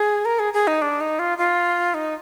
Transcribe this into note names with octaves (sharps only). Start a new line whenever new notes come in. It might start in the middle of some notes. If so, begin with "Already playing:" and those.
Already playing: G#4
A#4
G#4
G#4
D#4
D4
D#4
F4
F4
D#4